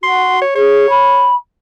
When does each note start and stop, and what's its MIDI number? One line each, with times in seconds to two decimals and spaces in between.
0.03 0.40 66
0.03 0.41 84
0.42 0.51 73
0.55 0.86 68
0.55 1.29 73
0.90 1.35 83